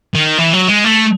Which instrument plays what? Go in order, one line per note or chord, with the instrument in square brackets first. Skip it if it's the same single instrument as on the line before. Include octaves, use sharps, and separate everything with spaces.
[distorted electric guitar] D#3
E3
F#3
G#3
A3